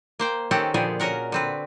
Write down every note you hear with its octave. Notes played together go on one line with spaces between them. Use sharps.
A#3 C5 G5
D#3 C4 C#4 G4 A4 F#5
A#2 D3 F3 B3 G4 G#4
C#4 F#4 A#4 F#5
D3 C4 B4